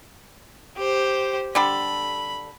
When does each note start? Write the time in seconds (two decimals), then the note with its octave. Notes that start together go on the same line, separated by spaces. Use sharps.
0.78 G4 C5
1.55 D3 G3 A4 B5